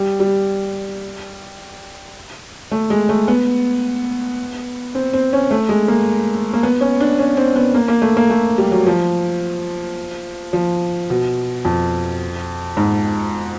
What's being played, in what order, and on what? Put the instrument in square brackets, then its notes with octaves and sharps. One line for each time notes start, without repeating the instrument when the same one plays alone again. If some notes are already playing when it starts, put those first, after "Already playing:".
Already playing: [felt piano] G3
G3
A3
G#3
A3
B3
C4
C4
C#4
A3
G#3
A#3
A#3
B3
C#4
D4
C#4
C4
B3
A#3
A#3
A3
A#3
A3
G3
F#3
F3
F3
B2
F2
G#2